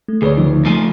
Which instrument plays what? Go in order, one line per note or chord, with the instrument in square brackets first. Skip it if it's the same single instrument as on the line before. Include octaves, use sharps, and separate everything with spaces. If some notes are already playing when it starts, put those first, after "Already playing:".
[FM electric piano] A3
[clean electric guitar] D2 [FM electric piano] G#4 B4 C#5
[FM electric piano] C#3 F3 D#4
[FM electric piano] F3 [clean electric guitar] A3 F4 G#5